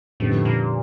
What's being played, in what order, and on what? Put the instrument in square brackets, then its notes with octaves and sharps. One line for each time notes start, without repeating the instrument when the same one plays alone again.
[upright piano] F2 D3 G3 B3 D#4 [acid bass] A2
[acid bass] A#2